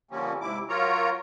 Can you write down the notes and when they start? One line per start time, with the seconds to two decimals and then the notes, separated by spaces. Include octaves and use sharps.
0.11 D3 F3 G3 A#3 C4 C#4
0.41 G#2 C3 E4 D6
0.69 F#3 F4 A#4 C#5 A#5